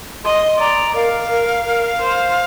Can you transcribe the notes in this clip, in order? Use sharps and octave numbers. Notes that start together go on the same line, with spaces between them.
D#5 C6
D5 A#5
A#4 F5
A#4
A#4
C5